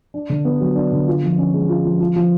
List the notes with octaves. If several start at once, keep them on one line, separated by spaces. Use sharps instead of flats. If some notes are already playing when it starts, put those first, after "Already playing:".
D4
D3
B3
F#3
D4
D3
F4
F3
C#4
G#3
F4
F3
F4
F3